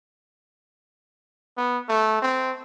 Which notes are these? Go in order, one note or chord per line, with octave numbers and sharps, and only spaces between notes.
B3
A3
C4